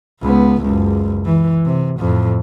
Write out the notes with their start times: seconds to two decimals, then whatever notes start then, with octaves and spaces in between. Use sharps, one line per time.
0.21 C#2 B3
0.62 F#1 C#2
1.26 E3
1.66 C3
1.99 F2 A2